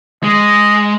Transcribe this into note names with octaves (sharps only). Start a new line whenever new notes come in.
G#3 D#5